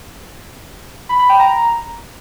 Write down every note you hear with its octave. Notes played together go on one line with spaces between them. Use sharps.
B5
B5
G5
A#5